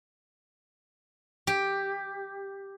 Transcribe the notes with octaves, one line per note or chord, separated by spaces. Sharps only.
G4